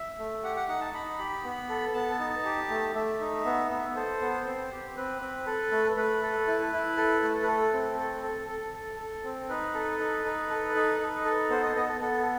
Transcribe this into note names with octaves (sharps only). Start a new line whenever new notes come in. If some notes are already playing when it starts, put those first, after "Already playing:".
Already playing: E5
A3
G4 F#5
F#5
D#4 F#5
A5
D#4 B5
G4
B3
A4
B3 A5
D#4
G4
A3
A3 E5
D#4
B3
B3
A4 C5
B3
C4
G4
C4 B4
C4
A4
A3
A3 B4
A4
E4
E4
A4
A3
B4
A4
C4
A4
A4
A4
A4
A4
C4
D#4 B4
A4
D#4
D#4
A4
D#4
D#4
A4
B3 C5
D#5
B3 D#5
A4
B3 A4